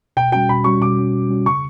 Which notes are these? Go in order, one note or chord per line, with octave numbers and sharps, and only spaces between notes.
B2 G5
G3 C#4 F#4 G5
B2 B5
G3 C#4 F#4 C#6
B2 D6
G3 C#4 F#4
B2
G3 C#4 F#4
C#3 C#6